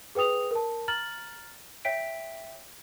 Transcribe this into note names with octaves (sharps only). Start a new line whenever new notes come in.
G#4 B4 G5 D#6 F7
A#4 A5
A#5 F6 A6 F#7
C#5 E5 G5 B6 D7